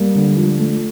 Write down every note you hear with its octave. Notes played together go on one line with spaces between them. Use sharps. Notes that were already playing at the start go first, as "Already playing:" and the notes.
Already playing: G3 A#3
D3
F3
A3